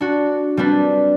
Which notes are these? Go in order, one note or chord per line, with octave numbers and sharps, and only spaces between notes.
D4 F#4
G3 C4 D4 B4